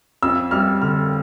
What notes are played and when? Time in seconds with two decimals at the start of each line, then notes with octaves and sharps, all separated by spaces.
0.23 F2 E6
0.51 G3 F6
0.82 D3 F6